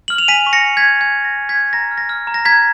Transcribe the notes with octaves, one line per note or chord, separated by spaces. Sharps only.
F6 F#7
F7
G#5 B6 D#7
C#6
A#6 C#7
G#5
G#6 B6
F6
G#5 G#6
C#6
A#6
G#5
G#6 B6
F6
A#5 A#6
F6
A#6
F6
A#5
A#6
A#5 G#6 B6